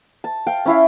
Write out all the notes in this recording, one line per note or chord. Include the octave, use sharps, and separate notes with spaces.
A5
F5 G5
C#4 E4 F5